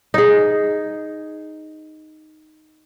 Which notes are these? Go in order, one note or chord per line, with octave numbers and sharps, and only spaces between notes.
D#4 G#4